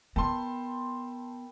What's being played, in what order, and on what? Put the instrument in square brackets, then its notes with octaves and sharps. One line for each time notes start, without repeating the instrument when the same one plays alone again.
[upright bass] B3 [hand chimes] A#4 G5 B5 [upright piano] A5 C6